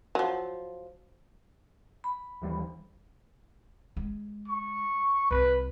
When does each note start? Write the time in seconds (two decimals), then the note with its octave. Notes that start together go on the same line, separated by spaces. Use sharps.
0.15 F3 F#3
2.04 B5
2.42 D#2 E3 G3
3.97 G#3
4.48 C#6
5.31 C2 B4